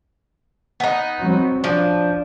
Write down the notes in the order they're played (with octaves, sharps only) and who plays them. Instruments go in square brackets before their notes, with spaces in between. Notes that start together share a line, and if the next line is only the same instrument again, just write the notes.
[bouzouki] B3 D#4
[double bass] F#3 C4
[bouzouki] F3 [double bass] D4